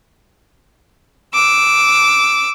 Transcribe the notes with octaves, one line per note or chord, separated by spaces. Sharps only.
D6 E6